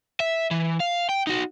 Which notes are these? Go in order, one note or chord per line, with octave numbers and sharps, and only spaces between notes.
E5
E3
F5
G5
D#4 F#4